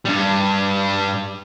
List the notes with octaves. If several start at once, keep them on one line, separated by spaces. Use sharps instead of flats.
G2 G3